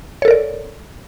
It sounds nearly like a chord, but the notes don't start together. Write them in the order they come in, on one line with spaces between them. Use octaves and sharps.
C#5 A4 A#4 D5